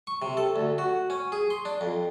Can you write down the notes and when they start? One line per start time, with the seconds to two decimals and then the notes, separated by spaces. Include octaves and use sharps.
0.07 C#6
0.22 C3
0.37 A4
0.56 D2
0.78 F#4
1.10 C#4
1.32 G#4
1.50 C6
1.65 D4
1.81 F2